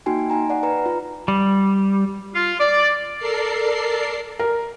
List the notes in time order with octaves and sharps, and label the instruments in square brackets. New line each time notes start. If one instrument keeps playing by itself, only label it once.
[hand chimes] A#3 D#4 F#4 G5 G#5
D#4 G#5 A#5
D5 F#5
B4 A#5
F4
[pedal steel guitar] G3
[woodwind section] F4
D5
[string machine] A4 A#4 D5 C7
[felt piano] A#4